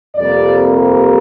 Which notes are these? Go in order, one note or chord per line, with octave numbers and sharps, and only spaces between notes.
F2 C3 G3 A#3 D5